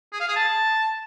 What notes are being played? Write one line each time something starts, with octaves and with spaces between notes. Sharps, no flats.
G#4
F5
G#4
A5